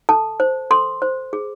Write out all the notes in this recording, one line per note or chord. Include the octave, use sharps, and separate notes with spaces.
A4 A5
C5
A4 C6
C5
G#4